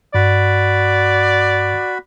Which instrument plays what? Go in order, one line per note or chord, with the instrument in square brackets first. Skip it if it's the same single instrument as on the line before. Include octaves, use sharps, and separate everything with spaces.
[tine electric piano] G2 [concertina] F#4 B5 [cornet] D5